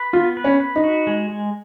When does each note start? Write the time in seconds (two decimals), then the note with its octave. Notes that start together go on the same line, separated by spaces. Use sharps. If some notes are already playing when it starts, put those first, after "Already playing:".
Already playing: B4
0.13 B3 F4
0.37 B4
0.44 C#4
0.60 B4
0.76 D#4
0.84 F#4
1.07 G#3
1.30 G#3